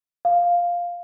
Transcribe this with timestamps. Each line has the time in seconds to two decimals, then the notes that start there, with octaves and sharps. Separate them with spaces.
0.25 F5